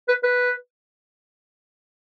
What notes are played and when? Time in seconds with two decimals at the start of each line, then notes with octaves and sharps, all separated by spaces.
0.08 B4
0.23 B4